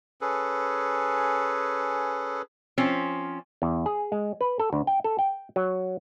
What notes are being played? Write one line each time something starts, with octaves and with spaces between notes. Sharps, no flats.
C#4 G#4 A4 B4
F3 C4 C#4
E2
G#4
G#3
B4
A4
D2
G5
A4
G5
F#3